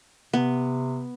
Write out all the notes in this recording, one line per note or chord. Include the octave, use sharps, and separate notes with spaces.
C3 B3